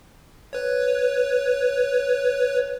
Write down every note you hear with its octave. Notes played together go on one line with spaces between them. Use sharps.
B4 C#5